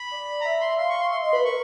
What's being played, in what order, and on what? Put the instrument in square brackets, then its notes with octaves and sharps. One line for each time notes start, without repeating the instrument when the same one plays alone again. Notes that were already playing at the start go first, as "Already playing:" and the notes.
Already playing: [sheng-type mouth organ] B5
[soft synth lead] D5
[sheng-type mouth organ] A#5
[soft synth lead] E5 [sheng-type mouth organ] B5
[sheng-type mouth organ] C6
[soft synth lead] F5 [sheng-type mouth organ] C6
[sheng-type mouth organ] C#6
C6
[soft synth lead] E5 [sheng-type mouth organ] C6
[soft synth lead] D#5 [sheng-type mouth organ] C6
[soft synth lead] B4 [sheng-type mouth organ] B5
[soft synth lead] A#4 [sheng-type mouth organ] C#6